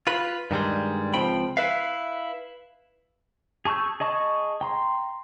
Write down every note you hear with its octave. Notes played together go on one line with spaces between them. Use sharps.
F4 B4
G2 D#3 G3 G#3
C#2 F3 C4 G5 B5
E4 B4 E5 F5
G#4 A5 C#6 E6 G6
G#4 D#5 A5 C#6 D#6
G5 A#5 C6